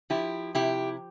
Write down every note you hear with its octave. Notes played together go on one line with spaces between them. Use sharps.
F3 E4 G4
C3 E4 G4